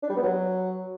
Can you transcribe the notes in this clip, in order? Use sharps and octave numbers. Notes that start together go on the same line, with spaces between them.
D4
G3
B3
F#3